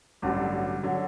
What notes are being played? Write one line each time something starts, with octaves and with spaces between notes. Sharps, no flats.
A1 G2 D3 F#3
D3 F#3